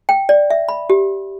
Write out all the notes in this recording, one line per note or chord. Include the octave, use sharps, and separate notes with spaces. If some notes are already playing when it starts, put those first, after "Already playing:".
G5
D5
E5
B5
G4